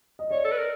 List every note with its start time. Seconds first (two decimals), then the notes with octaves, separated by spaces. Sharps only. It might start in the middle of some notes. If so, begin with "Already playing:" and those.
0.19 D#5
0.31 C#5 D5
0.45 A4
0.52 B4
0.58 A#4